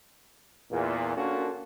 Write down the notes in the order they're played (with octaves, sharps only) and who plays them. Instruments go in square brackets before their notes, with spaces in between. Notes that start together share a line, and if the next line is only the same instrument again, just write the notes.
[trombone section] E2 A#2
A#3 C#4 D4 F4 F#4 A4